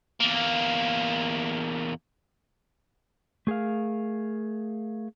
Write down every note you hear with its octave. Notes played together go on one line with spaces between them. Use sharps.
E2 A#3
A3 G#4 A#4 F5